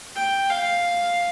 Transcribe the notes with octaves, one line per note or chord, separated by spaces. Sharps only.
G5
F5